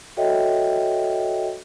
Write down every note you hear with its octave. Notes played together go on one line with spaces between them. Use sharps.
F#4 A4 C#5 D#5 E5 G5